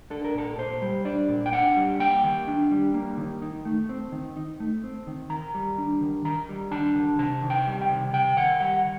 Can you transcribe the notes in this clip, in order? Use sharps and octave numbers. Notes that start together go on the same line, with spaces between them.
D4 A4
A#4
A#2 A4
A#2 C5
G3
D4 D5
A#2
G5
D4 F#5
G3
A#3 G5
D#3
D4
G3
A#3
D#3
D#4
A3
C4
D#3
D#4
A3
C4
D#3
D#3 A#5
G3
D4
D#3
D#3 A#5
G3
D4 A5
D#3
C3 A5
D#3
G5
G3
G5
C3
C3 G5
D#3 F#5
G3 F#5